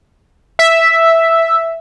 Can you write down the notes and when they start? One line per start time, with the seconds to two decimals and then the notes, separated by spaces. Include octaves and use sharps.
0.59 E5